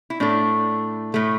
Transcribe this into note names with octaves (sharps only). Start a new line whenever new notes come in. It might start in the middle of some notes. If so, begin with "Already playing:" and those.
E4
A2 A3 D4
A2 A3